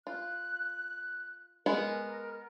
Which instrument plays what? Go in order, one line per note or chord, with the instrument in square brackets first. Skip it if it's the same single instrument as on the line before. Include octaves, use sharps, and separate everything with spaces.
[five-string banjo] F4 [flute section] F#6
[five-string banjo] G#3 B3 G#4 [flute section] A#4